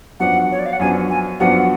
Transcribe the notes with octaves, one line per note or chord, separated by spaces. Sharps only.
F#2 F3 B3 D4 F#4 F#5
C#5
D5
F5
F#5
F#2 F3 B3 D4 F#4 G#5
G#5
F#2 F3 B3 D4 F#4 F#5